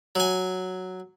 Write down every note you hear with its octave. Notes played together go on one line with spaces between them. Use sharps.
F#3 G#5